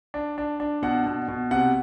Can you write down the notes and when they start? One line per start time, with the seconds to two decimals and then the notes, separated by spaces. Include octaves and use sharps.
0.14 D4
0.38 D4
0.60 D4
0.82 B2 F#5
1.06 B2
1.28 B2
1.51 C3 F#5